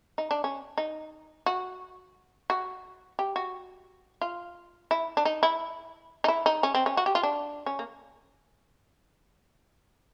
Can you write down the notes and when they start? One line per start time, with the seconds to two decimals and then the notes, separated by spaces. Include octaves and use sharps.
0.18 D#4
0.31 D4
0.44 C#4
0.78 D#4
1.46 F#4
2.50 F#4
3.19 G4
3.36 F#4
4.21 F4
4.91 E4
5.17 D4
5.25 D#4
5.43 E4
6.24 D#4
6.28 E4
6.46 D#4
6.63 C#4
6.75 C4
6.86 C#4
6.97 F#4
7.06 G4
7.15 F4
7.23 D4
7.66 C#4
7.79 A#3